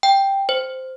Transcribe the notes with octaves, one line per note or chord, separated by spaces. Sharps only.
G5
C5